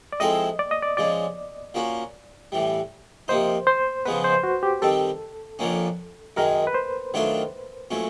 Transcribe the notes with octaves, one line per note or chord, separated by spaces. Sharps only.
D5
F3 G#3 C4 E4 A4 D#5
D5
D#5
D5
F3 G#3 C#4 D5
F3 A#3 C#4 F#4
A2 E3 G3
C3 F3 A#3 D#4 C5
C5
C#3 F3 G#3 B3 B4
C5
F#4
G4
D#3 G3 C4 A4
F2 D3 F3 A#3 C#4
F#2 D#3 G#3 A#4
B4
C5
D#3 F#3 A3 D4 F4
A#2 F#3 A3 C#4